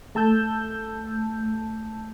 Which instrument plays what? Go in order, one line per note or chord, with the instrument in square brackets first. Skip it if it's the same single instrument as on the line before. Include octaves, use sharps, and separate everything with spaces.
[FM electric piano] A3 A5 E6 G6